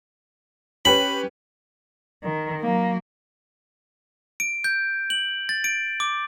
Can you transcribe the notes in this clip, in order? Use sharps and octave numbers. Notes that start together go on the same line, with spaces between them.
C#4 G4 B4 B5
D#3
F#3 A#3
D7
G6
F#7
A6
D7
D6